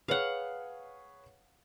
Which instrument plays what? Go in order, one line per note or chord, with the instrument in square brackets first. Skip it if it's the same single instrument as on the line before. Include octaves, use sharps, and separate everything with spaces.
[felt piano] G#4 B4 C#5 [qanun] F5 F#5